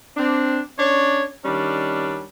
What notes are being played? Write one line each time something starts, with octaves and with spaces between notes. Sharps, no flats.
C4 D4
C#4 D4 C#5
D#3 G3 C#4 D4